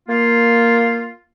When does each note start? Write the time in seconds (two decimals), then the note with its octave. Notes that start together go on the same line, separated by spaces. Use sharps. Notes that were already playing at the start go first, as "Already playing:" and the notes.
0.09 A#3 F4